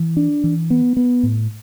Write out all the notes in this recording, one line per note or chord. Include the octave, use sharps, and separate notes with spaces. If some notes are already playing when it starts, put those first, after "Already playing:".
Already playing: E3
D4
E3
B3
B3
A2